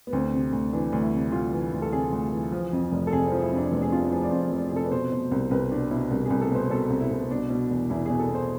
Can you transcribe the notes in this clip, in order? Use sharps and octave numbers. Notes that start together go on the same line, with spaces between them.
B3
D2 C4
C3
D2
E3 D4
D2
E4
C3
D2 F4
E3
D2
A4
C3 G#4
D2
E3
F3
F2
F1
A4
C3 G#4
F3 C4
E4
F2 D4
F1 B3
G#4
C3 F4
F3 G#4
D5
F2 C5
F1
C3 G#4
A4
B4
B2 C5
B2
C2
C2 B4
B2 D4
B2 E4
C2
C2 G#4
A4
B2 B4 C5
B2 A4
C2
E4
C2
B2 D4
B2
E2
E2 E4
B2 G#4
A4
B2
C5